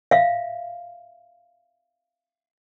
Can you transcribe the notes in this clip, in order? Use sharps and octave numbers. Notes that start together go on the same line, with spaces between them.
E5 F5